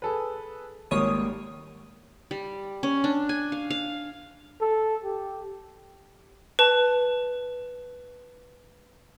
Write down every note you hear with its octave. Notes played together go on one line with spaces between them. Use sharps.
G#4 A4 B4
G#1 G3 G#3 A#3 C#5 D#6
G3
C#4
D4
G#5
F5
F5
A4
G4
B4 A5